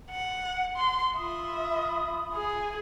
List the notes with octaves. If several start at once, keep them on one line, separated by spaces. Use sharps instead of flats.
F#5
C6
F4 E5 B5 D#6
G#4